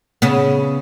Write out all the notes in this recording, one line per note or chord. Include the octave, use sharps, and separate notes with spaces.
C#3 B3